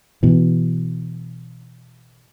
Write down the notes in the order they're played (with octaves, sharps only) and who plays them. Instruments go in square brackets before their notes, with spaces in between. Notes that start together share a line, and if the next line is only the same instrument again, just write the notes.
[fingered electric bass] B2 E3